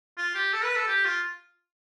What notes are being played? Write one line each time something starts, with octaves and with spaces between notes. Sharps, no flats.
F4
G4
A4
B4
A4
G4
F4